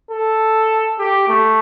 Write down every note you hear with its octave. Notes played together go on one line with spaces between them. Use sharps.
A4
G4
A3